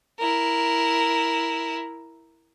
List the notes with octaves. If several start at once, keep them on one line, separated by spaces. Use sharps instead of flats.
E4 A#4